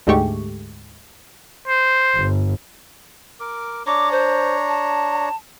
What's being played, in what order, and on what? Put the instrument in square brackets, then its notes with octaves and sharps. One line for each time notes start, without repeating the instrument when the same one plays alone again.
[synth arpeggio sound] D2 G#2 G#3 A3 G4 C#6
[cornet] C5
[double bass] G1
[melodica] A#4 D6
[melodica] D4 C#5 A#5 [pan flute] D6
[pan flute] C5
A5